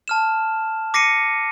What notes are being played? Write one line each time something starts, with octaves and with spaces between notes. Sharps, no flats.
A5 F6 E7
D6 A#6 C7 C#7 D#7